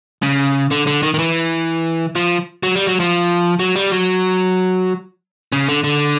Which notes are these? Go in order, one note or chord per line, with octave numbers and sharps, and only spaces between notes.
C#3
D3
D3
D#3
D#3
E3
F3
F#3
G3
F#3
F3
F#3
G3
F#3
C#3
D3
D3